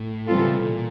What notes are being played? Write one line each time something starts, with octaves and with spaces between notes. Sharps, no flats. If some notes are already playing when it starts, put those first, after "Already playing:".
Already playing: A2
E3 G3 C4 F4 A4
D3
C#3
C3
B2
A#2